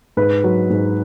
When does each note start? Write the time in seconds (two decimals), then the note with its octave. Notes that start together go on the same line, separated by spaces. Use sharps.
0.17 G#2 B4
0.44 F#3
0.70 G#2